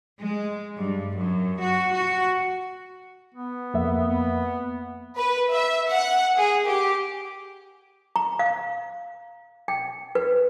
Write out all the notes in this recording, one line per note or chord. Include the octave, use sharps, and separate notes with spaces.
G#3
G2
F#2
F#4
F#4
B3
F2 A#3 E5
B3
B4
E5
F#5
G#4
G4
A#5
F5
G5
B4